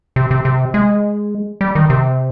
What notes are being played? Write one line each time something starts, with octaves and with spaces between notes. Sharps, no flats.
C3
C3
C3
G#3
G3
D#3
C3